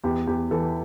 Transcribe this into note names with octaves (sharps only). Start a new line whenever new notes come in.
E2 G4
E2 G4
E3 A4